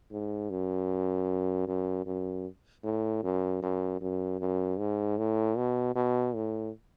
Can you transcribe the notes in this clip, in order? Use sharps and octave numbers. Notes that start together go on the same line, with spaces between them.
G#2
F#2
F#2
F#2
A2
F#2
F#2
F#2
F#2
G#2
A2
B2
B2
A2